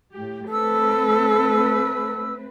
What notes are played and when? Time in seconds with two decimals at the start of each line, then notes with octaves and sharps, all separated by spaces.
0.12 A2 G4
0.51 A3 C4 A4 B4 E6